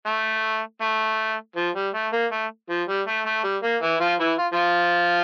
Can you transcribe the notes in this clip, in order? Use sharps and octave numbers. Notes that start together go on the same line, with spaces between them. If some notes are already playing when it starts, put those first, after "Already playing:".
A3
A3
F3
G3
A3
A#3
A3
F3
G3
A3
A3
G3
A#3
E3 E4
F3 F4
E3 E4
F4
F3 F4